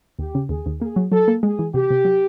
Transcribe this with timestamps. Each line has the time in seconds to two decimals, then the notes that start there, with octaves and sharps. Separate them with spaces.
0.19 D#2 G4
0.35 C#3
0.49 D#2 G#4
0.66 D#2
0.81 A#3 G#4
0.96 F#3
1.12 F#3 A4
1.28 A#3
1.43 G#3 G#4
1.59 E3
1.74 C3 G4
1.90 C3
2.05 F#3